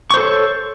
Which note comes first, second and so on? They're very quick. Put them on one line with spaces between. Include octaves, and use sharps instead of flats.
C#6 C5 A4 C#5